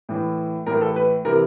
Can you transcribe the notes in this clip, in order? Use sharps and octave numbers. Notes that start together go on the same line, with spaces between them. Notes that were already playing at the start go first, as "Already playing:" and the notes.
A2 E3
A2 E3 A#4
A4
B4
C3 E3 A#4